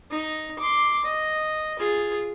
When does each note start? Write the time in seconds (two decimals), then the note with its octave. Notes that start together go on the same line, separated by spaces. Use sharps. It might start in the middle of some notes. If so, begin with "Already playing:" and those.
0.11 D#4
0.59 C6 D6
1.05 D#5
1.79 F4 G#4